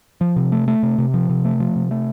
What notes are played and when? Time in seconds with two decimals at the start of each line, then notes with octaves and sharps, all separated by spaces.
0.21 F3
0.36 C3
0.52 A3
0.68 A3
0.83 C3
0.98 C3
1.14 F3
1.29 C3
1.45 A3
1.60 F3
1.76 C3
1.91 A3